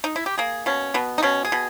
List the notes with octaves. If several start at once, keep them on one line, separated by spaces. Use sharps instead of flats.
D#4
E4
G4
A#3 G#4
B2 C#4
B2 B3
D#4
B2 C#4
G#4
B2